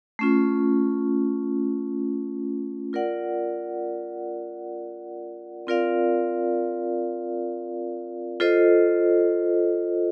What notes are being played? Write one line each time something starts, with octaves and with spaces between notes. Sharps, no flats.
A3 C#4 F4
F4 A#4 D5 F#5
C4 F4 A#4 D5 F5
F4 A4 C5 D#5